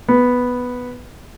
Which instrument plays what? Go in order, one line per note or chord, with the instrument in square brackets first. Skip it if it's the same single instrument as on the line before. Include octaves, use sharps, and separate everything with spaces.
[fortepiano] B3